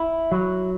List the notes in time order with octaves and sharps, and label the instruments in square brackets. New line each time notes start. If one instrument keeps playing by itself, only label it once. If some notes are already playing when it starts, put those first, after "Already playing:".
Already playing: [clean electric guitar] E4
F#3